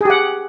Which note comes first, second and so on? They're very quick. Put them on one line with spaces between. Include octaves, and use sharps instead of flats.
G#4 G4 F#5